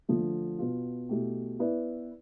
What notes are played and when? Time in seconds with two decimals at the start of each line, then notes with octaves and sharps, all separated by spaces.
0.09 D3 F3 A3
0.59 B2 B3 F4
1.09 B2 A3 E4 G4
1.59 B3 E4 B4 D5